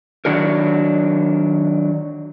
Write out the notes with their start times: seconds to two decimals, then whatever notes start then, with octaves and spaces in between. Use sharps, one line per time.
0.25 D#3 F#3 D4 F#4 A#4